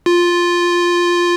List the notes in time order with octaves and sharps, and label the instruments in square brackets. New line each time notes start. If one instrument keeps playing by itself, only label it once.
[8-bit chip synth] F4